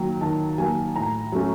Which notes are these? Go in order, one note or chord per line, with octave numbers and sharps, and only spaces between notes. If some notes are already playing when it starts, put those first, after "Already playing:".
Already playing: D#3 F#3 A#3 G5
D#3 A5
F#3 A#3 G#5
A2 A#5
F#3 A3 C#4